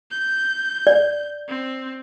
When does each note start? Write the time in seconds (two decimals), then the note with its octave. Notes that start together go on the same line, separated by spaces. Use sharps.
0.11 G6
0.87 D5
1.48 C4